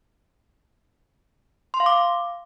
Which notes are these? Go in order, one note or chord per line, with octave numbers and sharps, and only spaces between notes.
C6
F5
D6
F5